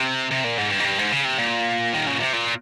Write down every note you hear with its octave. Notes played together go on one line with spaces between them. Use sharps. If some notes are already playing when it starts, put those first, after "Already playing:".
Already playing: C3
C3
A#2
G#2
G2
G#2
G2
G#2
C#3
C3
A#2
D#3
C#3
C3
A#2